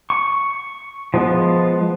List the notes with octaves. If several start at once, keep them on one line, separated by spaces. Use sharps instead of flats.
C#6
F3 G#3 B3